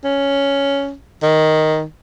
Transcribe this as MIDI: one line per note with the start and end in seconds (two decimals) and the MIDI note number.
0.04 0.93 61
1.23 1.83 51